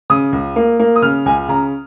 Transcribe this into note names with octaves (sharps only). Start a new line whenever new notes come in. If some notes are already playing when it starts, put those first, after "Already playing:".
C#3 D#6
C#2
A#3
A#3
D#6
C#3 F6
C#2 G#5
C#3 A#5